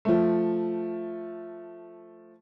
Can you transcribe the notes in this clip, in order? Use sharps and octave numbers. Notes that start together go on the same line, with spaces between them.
F3 A3